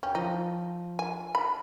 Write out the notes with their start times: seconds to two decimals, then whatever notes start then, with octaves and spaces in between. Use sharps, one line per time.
0.03 C#4 G5
0.15 F3 D#4
0.99 G#5
1.35 B5